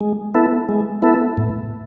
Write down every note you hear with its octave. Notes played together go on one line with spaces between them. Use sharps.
G#3
B3 E4 A4
G#3
B3 E4 A4
A2